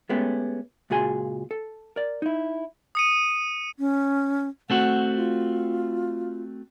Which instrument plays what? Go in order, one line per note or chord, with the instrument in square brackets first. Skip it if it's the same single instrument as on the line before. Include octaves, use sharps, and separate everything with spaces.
[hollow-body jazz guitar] G#3 A3 B3 C#4 G4
C#2 A#2 F#4 G#4 G#5 C6
A4
A#4 D5
D#4 E4
[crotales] D#6 C#7 D#7
[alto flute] C#4
[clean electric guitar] A3 C4 F#4 [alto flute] F#5
[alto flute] F4